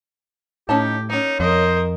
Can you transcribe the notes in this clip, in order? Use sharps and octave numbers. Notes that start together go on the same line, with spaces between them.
A2 C#4 D#4 G4 A5
A#3 C#4 D#4
F2 A#4 C5 D#5